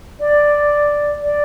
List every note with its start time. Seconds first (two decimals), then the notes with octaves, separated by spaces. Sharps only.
0.20 D5
1.22 D5